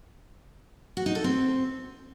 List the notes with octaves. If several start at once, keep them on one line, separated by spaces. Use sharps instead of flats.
F#4
D#4
A4
C4